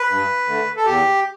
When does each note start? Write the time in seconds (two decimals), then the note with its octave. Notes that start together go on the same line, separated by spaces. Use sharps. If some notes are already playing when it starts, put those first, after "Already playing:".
Already playing: B4
0.09 G2
0.47 D3 A3
0.77 A4
0.86 E2 G4